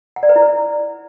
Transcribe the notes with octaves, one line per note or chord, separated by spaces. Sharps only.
F#5
D5
B4
E4
B4